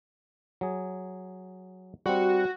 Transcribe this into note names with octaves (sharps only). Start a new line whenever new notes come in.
F#3 G#4
G3 C4 F#4